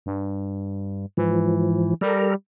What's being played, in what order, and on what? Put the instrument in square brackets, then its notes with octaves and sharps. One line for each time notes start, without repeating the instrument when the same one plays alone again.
[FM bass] G2
[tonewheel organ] G#2 F3 [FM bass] E3
[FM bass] G3 [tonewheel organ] A4 A#4 A#5